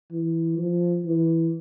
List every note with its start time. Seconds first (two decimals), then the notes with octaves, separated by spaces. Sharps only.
0.12 E3
0.58 F3
1.06 E3